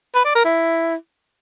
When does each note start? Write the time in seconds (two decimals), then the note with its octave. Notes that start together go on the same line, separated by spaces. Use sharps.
0.15 B4
0.25 D5
0.35 A#4
0.45 E4